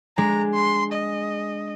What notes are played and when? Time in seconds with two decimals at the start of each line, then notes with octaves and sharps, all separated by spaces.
0.18 G#3 D4 A#5
0.54 C6
0.93 D#5